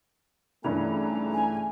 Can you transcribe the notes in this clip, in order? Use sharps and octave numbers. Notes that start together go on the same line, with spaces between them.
G2 C#3 E3 A3 C#4 D#4 A#5
G#5